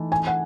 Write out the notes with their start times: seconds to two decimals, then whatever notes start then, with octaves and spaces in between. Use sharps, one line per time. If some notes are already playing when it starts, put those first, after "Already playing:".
Already playing: E3 A3 D#4 A4
0.12 G#5
0.27 F#5